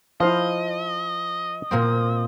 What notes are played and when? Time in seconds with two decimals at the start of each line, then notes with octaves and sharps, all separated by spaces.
0.20 F3 E4 C5 D#5 F5
1.71 A#2 A#3 C4